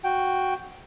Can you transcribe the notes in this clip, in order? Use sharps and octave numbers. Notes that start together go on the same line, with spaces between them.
F#4 G5